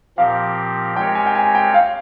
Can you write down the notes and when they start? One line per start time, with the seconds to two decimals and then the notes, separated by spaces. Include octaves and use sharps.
0.18 A#2 F3 C4 G4 A#4 F5
0.96 G#3 C4 G4 A#4 C#5 G5
1.15 G#5
1.26 G5
1.35 G#5
1.55 G5
1.74 F5